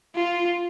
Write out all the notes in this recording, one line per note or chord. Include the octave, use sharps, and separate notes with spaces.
F4